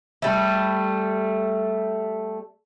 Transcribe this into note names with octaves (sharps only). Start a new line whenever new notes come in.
G3 A3